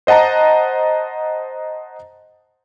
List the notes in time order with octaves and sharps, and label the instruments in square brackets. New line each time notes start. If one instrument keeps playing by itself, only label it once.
[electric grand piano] C5 D#5 F#5 A5 A#5